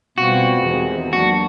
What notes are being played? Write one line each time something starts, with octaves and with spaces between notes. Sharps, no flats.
B2 G3 C4 F4 F#4
E2 C3 D#3 G#3
F#3 A#3 D4 F#4